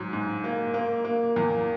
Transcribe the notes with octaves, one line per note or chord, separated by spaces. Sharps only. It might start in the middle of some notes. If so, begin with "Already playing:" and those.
Already playing: G#2 F#3
G#2
A#3
A#3
A#3
E2